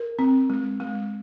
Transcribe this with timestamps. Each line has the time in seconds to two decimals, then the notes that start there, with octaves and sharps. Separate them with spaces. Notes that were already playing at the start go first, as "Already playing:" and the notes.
Already playing: A#4
0.19 C4
0.50 G#3
0.80 G#3